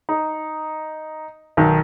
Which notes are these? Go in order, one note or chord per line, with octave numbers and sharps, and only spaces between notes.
D#4
B1 D#3